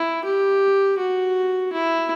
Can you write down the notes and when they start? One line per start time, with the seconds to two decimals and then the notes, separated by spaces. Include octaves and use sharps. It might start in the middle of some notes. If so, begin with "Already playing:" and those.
Already playing: E4
0.24 G4
0.98 F#4
1.73 E4